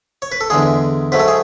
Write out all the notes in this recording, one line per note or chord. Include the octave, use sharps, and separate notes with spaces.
C#5
B4
A4
E2 D3 G#3 G#4
G#2 F#3 A3 B4
A4
G#4